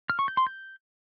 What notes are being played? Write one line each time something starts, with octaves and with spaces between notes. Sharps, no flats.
F6
C#6
G6
C6
G6